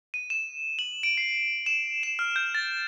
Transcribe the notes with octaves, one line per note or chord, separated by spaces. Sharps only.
D#7
E7
F#7
D7
C7
E7
E7
F6
G6
A6